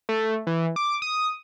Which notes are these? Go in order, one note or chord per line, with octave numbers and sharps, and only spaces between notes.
A3
E3
D6
D#6